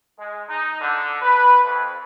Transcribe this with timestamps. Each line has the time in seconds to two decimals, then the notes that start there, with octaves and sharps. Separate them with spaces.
0.18 G#3
0.49 D#4
0.81 D3
1.22 B4
1.63 F2